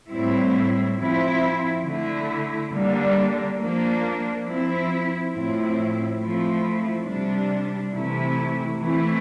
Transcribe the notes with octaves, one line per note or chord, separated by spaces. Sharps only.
A2 G3 C4 E4
F3 C4 E4
D3 A3 E4
D3 G3 A#3 D4
F3 A#3 D4
F3 C4 E4
A2 F3 C4 E4
F3 A3 C4 E4
C3 G3 D4
C3 E3 A3 E4
E3 A3 C4 E4